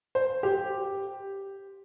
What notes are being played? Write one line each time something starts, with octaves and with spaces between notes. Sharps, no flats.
C5
G4